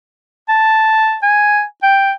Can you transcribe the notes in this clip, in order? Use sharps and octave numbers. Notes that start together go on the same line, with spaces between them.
A5
G#5
G5